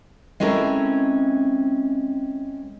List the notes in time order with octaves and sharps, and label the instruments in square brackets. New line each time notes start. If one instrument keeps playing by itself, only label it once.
[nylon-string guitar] G#3 C4 C#4 E4 A4 A#4